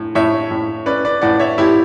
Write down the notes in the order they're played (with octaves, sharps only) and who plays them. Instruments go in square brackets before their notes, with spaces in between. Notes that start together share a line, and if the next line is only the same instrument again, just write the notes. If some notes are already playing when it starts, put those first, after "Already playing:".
Already playing: [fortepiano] A2
[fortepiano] A2 [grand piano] C#5 E5
[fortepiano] A2
[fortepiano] C#4 [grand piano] B4 D5
[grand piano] B4 D5
[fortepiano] A2 [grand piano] D5 F#5
[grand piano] C#5 E5
[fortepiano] A2 [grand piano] E4 G4